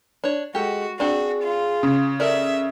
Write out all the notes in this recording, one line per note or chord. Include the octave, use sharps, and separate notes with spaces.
D4 C#5
G#3 F#4 G4 A4
C4 D4 F#4 G#4
F4
C#3
A4 A#4 D5 E5